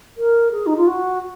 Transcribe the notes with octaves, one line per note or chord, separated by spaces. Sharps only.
A#4
G#4
D#4
F4
F#4